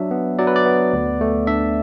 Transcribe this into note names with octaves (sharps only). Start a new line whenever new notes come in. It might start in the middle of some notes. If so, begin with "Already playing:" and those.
Already playing: F#3 D4 E5
B3
F#3 D5
B4
D5
B3
D2
A3
D4 E5